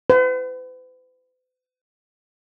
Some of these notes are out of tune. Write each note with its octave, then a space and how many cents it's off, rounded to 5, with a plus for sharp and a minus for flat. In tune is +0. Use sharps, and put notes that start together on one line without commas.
B4 +45